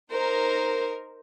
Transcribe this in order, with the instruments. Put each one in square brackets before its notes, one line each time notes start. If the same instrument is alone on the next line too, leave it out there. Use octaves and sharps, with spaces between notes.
[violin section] D#4 A#4 [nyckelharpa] C5